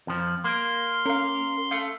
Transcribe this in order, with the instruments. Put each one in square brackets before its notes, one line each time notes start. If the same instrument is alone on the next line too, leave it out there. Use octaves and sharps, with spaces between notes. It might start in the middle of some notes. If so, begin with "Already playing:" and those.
[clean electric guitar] F2 F3
[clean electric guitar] A#3 [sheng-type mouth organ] C6
[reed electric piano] C#4 [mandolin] A#4 F5
[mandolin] A3 F5